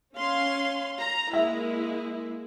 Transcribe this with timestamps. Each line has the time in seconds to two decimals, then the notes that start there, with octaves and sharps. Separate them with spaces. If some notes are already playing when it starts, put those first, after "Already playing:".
0.16 C#4 F5 C6
0.99 A#5
1.33 G#3 A#3 E4 E5